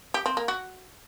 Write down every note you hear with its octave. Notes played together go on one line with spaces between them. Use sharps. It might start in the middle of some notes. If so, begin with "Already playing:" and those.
G4
C4
A#3
F#4